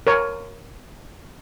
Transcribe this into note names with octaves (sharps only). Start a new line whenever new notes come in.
A#4 C#5